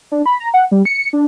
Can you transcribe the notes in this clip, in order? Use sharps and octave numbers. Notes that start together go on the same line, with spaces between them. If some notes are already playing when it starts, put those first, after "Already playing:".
D4
B5
A#5
F#5
G3
C#7
D4